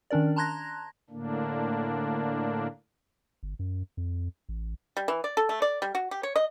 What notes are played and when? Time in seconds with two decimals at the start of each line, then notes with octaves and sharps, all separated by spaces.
0.11 D#3 C#4 D4 A#4 D5
0.36 A5 A#5 C6 F#6 G#6 A#6
1.10 A2 D3 A#3 D4
3.43 G1
3.59 F#2
3.97 F2
4.49 A1
4.97 G3
5.08 E3
5.24 D5
5.37 A4
5.49 A3
5.62 D5
5.82 G3
5.95 F#4
6.11 G4
6.23 C#5
6.36 D#5